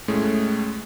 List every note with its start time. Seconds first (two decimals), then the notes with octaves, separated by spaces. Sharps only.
0.08 A2 G#3 A3 C#4